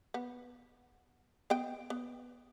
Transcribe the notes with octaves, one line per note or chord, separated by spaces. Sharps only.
B3
B3 D#5 G5
B3